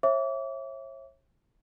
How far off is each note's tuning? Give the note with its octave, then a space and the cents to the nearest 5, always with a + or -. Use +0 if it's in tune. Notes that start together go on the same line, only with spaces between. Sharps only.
C#5 -40 E5 +0 D6 -35